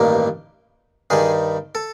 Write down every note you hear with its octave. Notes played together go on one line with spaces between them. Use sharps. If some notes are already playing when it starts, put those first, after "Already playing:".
Already playing: A1 G2 D#3 G3 A#3
G2 D#3 G3 G#4
A4